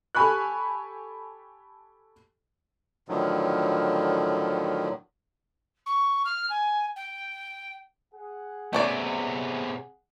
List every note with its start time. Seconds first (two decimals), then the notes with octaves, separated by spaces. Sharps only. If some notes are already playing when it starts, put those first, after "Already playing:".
0.15 G4 A4 G#5 B5 C#6 F#6
3.08 A2 D3 D#3 F3 F#3
5.86 C#6
6.25 F6
6.50 G#5
6.96 G5
8.14 G#4 F#5
8.73 C3 A3 B3 C#4 D5